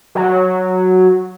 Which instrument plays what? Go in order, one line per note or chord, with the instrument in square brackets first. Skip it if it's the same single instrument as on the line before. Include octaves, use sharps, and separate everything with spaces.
[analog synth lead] F#3